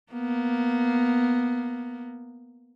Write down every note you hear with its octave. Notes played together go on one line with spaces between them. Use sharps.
A#3 B3